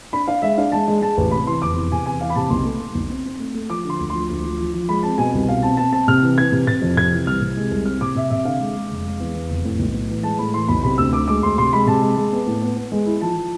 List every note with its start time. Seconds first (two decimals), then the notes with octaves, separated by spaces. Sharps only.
0.13 D4 B5
0.28 D4 F5
0.42 G#3 E5
0.57 D4 F5
0.72 G#3 A5
0.88 G#3
1.01 G#3 A5
1.17 A1
1.31 C3 B5
1.46 E3 C6
1.62 F1 D6
1.76 E2
1.91 C3 G#5
2.06 E2 G#5
2.21 E3 F5
2.30 B5
2.36 C3 A5
2.50 B1 C6
2.65 A3
2.80 A3
2.95 B1
3.10 C4
3.26 C4
3.39 A3
3.54 A3
3.69 F3 D6
3.85 D3 C6
3.99 D2
4.10 F3 C6
4.29 D2
4.44 F3
4.60 F3
4.73 F3
4.89 G#3 B5
5.03 C4 A5
5.18 B2 G#5
5.33 C2
5.49 B2 F5
5.63 C4 A5
5.77 C4 A5
5.92 C4 A5
6.08 C3 F6
6.22 E3
6.38 E3 G#6
6.52 C3
6.67 C3 A6
6.82 F2
6.96 C3 G#6
7.12 E3
7.27 C2 F6
7.41 C3
7.57 G#3
7.71 C2
7.85 C4 F6
8.01 C3 D6
8.15 C3 E5
8.30 C3 E5
8.45 D3 F5
8.60 G#3
8.76 G#3
8.90 F1
9.06 G#3
9.20 E2
9.35 E2
9.50 F1
9.65 A2
9.79 B1
9.94 A2
10.09 E3
10.23 G#3 A5
10.39 A2 B5
10.54 E3 C6
10.68 B1 B5
10.84 C3 B5
10.98 D2 E6
11.13 D2 D6
11.28 G#3 D6
11.42 D2 C6
11.58 C3 C6
11.73 G#3 B5
11.87 C3 A5
12.02 G#3
12.17 G#3
12.32 B3
12.47 A2
12.62 B3
12.76 B3
12.92 G#3
13.06 E4
13.21 F3 A5
13.36 F3